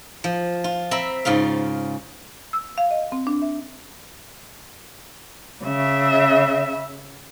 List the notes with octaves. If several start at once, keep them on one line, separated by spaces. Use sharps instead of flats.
F3
F4
C4 E5 A#5 B5
G#2 C#3 F4 F5
E6
F5
D#5
C4
D4
E5
C#3 E5